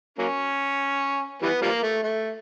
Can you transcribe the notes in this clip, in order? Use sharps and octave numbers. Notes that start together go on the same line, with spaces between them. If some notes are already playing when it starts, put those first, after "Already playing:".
F#3 A#3 C#4
E3 G3 B3
F3 G3 A#3
A3
A3